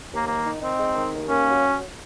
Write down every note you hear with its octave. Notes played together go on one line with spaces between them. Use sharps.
D#2 A#3
D#3 A#3
D#4
C4 D#4
G#3
D#3
D#2
A#3 C#4
F#3